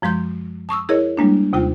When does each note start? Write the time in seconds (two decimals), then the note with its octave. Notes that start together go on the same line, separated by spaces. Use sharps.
0.02 F#2 F3 G#3 C6 G6
0.69 A5 C#6 D#6 E6
0.89 E4 G#4 A#4 C#5 D#5
1.17 G3 G#3 A#3 D4
1.53 D#2 C3 F4 G5